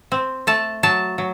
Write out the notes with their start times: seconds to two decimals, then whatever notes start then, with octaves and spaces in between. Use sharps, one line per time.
0.12 C4
0.47 A3 A5
0.83 F#3 A5
1.18 F#3